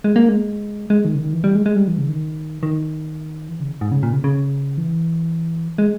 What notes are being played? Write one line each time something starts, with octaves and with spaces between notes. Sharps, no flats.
G#3
A#3
G#3
G#3
D#3
C#3
D#3
E3
G3
G#3
G#3
G3
E3
C#3
D#3
D#3
E3
C#3
G#2
C#3
A#2
C#3
C#3
E3
G#3